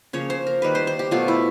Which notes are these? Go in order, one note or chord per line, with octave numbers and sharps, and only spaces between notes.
C#3 F3 A#3 C#5
C5
A#4
D#3 G3 A#3 B4
C5
C5
G4
B2 F#3 A3 F4
E4